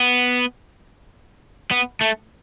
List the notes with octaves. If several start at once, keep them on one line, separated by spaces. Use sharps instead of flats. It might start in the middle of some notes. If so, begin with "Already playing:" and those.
Already playing: B3
B3
A3